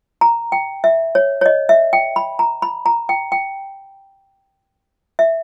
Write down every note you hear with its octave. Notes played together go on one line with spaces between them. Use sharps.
A#5
G5
E5
C#5
C#5
D#5
E5
G5
B5
A#5
B5
A#5
G5
G5
E5